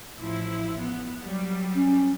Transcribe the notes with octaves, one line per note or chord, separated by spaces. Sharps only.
A1 F3 E4
B3
F#3 G3
C#4